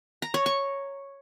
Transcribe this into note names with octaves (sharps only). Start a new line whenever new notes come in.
A#5
C#5
C#6